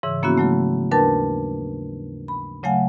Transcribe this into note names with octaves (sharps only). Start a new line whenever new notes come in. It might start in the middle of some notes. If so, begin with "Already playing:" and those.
G#2 C#3 E3 E6
F3 A#3 B3 C#4 E4 F#4
C#3 F#3 A3
D#2 D4 A#4 B4 A5 A6
B5
C#3 F#3 A3 F5 F#5 G#5